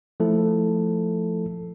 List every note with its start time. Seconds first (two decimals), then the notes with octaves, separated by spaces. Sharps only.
0.20 F3 A3 E4 A4